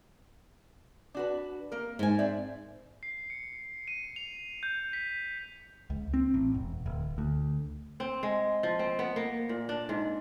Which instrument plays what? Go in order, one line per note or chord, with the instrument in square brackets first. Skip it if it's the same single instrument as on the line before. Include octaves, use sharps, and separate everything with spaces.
[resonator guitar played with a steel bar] D4 F#4 B4
A#3 A#4
[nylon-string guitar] G#2 G#5
[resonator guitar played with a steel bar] C4 D5 E5
[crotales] C7
C#7
D#7
F7
G6
B6
[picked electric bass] C#2
C4
A1
E1
D1
D2
[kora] C4
G#3
F3
C4
B3
A#3
A#2
D4
G#2